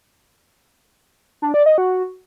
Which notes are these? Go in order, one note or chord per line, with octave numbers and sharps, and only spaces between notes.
D4
D5
D#5
F#4